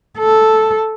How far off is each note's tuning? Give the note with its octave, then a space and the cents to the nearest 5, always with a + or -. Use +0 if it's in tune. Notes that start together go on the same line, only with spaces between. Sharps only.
A4 -5